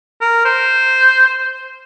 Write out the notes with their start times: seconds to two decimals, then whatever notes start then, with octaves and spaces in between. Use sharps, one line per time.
0.21 A#4
0.45 C5